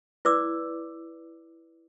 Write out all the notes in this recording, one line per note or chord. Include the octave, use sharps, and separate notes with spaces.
E4 B4 D5 D6 E6